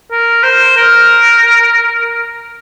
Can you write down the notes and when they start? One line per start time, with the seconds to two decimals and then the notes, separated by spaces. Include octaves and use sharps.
0.11 A#4
0.44 C5
0.77 A#4